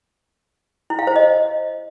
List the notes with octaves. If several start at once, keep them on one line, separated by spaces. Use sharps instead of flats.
E4
F5
C5
D#5